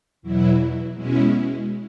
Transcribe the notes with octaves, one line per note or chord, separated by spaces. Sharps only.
E2 B2 F#3 E4
B2 G#3 C#4 E4